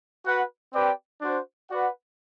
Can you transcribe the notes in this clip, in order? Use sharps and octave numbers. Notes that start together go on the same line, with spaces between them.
F#4 B4 F#5
C4 G4 B4 D5 G5
D4 F#4 C5
F#4 B4 D5 F#5